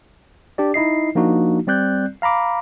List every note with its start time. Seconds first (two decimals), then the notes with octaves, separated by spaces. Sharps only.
0.58 D4 G4 D5
0.74 D#4 E4 D#5 C7
1.15 F3 A#3 D4 D#4 F#4
1.67 G3 C4 D5 F#6 G6
2.22 F5 A#5 B5 D6